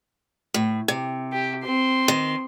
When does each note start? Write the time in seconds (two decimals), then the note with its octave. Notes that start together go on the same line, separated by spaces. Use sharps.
0.54 A2
0.88 C3
1.32 G4
1.64 C4 C6
2.08 D#3